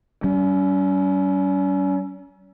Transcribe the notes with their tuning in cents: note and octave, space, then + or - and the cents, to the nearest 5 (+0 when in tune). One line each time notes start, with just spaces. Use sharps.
G3 -45 C#4 +30